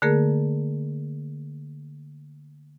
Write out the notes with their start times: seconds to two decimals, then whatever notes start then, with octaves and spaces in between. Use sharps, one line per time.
0.02 D3 A3 A#3 G#4 A#4